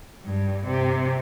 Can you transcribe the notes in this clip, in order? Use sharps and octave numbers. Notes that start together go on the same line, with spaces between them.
G2
C3